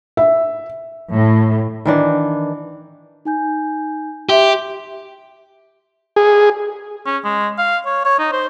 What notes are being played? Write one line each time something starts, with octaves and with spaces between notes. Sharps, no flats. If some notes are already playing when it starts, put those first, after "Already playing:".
E5
A2
D#3 E3 D4
D#4 G#5 G6
G4 E5 C6
G#4
C#4
G#3
F5
C#5
C#5
D#4
C5